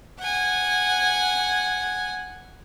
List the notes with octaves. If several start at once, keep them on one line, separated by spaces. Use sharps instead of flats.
F#5 G#5